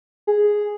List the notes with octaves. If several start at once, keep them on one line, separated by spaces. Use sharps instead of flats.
G#4